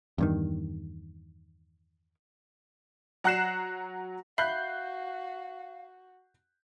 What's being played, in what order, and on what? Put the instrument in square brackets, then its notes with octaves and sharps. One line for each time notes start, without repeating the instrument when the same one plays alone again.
[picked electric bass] E2 G2 D#3
[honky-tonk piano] F#3 F#5 A#5 F#6 C7 E7
[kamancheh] F#4 [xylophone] E5 B5 [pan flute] F5 [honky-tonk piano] F#6 G6 C7